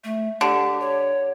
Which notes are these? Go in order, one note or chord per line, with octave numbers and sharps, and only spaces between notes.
A3
D3 G4
C#5